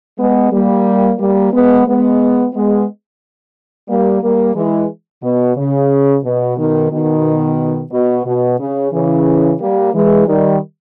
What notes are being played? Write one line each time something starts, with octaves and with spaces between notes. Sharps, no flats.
G#3 B3
G3 A#3
G3 A#3
G#3 B3
G#3 B3
G#3 B3
G3 A#3
G3 A#3
E3 G#3
B2
C#3
B2
B2 D#3
B2 D#3
B2
B2
C#3
C#3 E3
G3 A#3
E3 G#3
D#3 G3